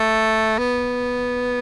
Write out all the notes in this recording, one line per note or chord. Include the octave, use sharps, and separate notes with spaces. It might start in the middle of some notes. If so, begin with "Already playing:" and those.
Already playing: A3
B3